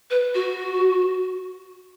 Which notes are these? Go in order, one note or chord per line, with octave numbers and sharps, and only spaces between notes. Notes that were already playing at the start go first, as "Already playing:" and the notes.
B4
F#4